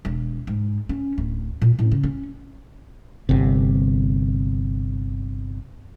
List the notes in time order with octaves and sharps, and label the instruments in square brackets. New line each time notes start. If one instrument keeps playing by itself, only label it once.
[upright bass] E1
G#2
C#4
D1
A#2
A2
C#3
C#4
[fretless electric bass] G1 C3